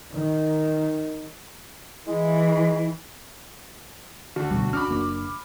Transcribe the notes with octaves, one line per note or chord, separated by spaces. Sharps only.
D#3
E3 G#3 E4
D2 F#4
B2 G3
C#4 D4 B5 D6 F6
F#1 A#3 D4